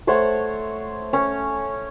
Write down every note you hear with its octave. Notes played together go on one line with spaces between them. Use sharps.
A3 C5 C#5 F#5
C#4